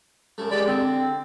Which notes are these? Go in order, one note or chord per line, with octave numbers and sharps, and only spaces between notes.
F#2 A3
G#3 G4 D5 B5
D3 C4